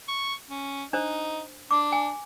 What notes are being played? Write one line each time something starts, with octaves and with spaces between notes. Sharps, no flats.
C#6
C#4
D4 D#4 C5
D4 D6
G#5